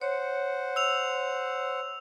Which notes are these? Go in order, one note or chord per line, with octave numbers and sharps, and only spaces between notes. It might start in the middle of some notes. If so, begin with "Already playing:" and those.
C5 C#5 F#5
E6 F7